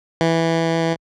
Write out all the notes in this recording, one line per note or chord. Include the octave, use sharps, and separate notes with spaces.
E3